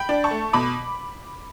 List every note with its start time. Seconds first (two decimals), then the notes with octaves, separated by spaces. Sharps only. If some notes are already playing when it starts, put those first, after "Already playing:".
Already playing: G5 B5
0.09 D4
0.24 A5 C#6
0.31 A3
0.53 B2 B5 D6